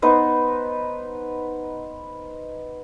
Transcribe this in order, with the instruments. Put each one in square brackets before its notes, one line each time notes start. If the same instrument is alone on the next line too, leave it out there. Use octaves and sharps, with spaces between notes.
[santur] B3 D#4 B4 C5